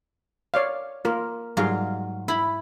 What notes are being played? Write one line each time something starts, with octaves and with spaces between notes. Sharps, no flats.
C#5 D5 F5
A#3 F4 A#4
G#2 F#3 G3 F4 G#4 F5
E4 B5